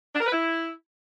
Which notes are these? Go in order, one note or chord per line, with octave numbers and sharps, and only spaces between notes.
D4
A#4
B4
E4